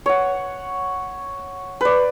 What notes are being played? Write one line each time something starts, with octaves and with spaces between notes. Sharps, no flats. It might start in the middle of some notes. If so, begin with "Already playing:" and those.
C#5 F#5
B4 D5